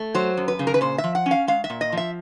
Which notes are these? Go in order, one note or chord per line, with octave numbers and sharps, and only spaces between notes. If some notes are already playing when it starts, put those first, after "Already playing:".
Already playing: A3
F#3 C5
F#2
B4
C#3
A#4
B4
A#2 C5
E5
F3
F#5
C#4
F5
G#3 F5
E5
A#2
D#5
F3
E5